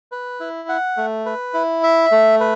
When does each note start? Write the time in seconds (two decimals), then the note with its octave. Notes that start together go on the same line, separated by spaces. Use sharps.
0.12 B4
0.40 E4
0.69 F#5
0.97 A3
1.26 B4
1.54 E4
1.83 E5
2.12 A3
2.40 B4